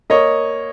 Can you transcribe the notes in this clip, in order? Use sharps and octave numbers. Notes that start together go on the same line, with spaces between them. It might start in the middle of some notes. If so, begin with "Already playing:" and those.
A#3 C#5 D#5